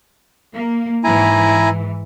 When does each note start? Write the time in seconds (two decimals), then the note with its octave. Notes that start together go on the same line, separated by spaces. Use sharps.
0.52 A#3
1.04 G#2 E3 E4 G#5 A#5